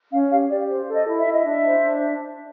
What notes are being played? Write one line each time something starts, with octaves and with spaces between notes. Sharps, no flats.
C#4 F5
G4 F5
G4 D5
C5
A4
D#5
E4
E5
E4
D#5
D4 E5
C5
D4